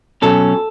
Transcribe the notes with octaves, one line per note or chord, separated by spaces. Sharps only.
B2 F#3 C#4 A4